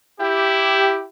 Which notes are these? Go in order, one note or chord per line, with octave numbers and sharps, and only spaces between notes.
E4 G4